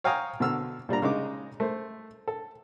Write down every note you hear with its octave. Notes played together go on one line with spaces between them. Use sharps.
C#5 F5 G5 G#5 A#5 D#6
B2 D3 E6 F6
A#2 G3 D4 A#5
C#3 G#3 D#4 D6
A3 C5
A4